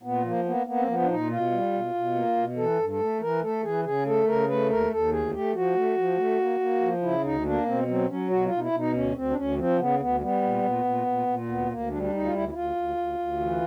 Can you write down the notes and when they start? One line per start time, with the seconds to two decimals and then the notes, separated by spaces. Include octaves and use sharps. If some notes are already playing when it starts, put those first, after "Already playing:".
0.03 A#2 B3
0.24 F3 A#3
0.45 A#3 B3
0.66 A#3 B3
0.77 C4
0.87 F3 B3
1.02 D4
1.09 A#2 D#4
1.30 B2 F4
1.51 G3
1.73 B2
1.94 B2
2.15 A#3
2.37 B2
2.57 E3 A4
2.79 G2
2.90 A4
3.00 A3
3.21 E3 A#4
3.42 A3 A4
3.63 E3 G#4
3.84 C#3 G#4
4.06 A3 A4
4.26 C#3 A#4
4.48 A3 B4
4.69 D#2 A#4
4.90 D#2 A4
5.12 D2 G#4
5.33 A3 G4
5.55 F3 F#4
5.75 A3
5.97 F3
6.18 A3
6.39 A#3
6.60 A#3
6.81 F3
7.03 C#3 E4
7.24 D2 D#4
7.45 A#3 D4
7.66 B2 C4
7.87 F#3 C4
8.09 F#3 C#4
8.30 B2 F#4
8.45 F4
8.52 B2
8.57 D#4
8.61 E4
8.72 B2
8.78 D#4
8.94 D2 C#4
9.15 D2 C4
9.31 D4
9.36 D2 C#4
9.57 F3 C4
9.78 C#3 B3
10.00 D2 B3
10.20 G3 B3
10.43 A#2
10.63 A#2
10.84 A#2
11.06 A#2
11.27 A#2
11.48 D2 B3
11.70 D2 A#3
11.90 G3 D4
12.03 D4
12.13 D2 D#4
12.24 F4
12.33 D2 E4
12.49 E4
12.54 D2 F4
12.75 D2
12.97 D2
13.19 D2
13.40 E3